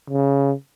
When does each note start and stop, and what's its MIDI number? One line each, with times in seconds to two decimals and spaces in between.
0.10 0.52 49